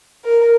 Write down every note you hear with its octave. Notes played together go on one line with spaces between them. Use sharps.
A#4